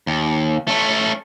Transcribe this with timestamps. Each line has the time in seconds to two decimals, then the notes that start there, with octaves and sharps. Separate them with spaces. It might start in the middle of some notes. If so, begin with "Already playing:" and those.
0.07 D#2
0.68 A3 C#4